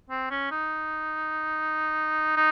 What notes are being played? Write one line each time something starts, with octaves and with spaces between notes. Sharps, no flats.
C4
C#4
D#4
D#4